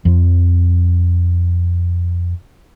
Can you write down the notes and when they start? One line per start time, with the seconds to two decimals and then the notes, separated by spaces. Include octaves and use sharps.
0.05 F2 F3